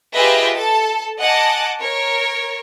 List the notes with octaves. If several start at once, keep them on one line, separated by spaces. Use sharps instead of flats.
F4 G4 G#4 B4 D#5 E5
A4 A5
D#5 F#5 G#5 A5 D6
A#4 C#5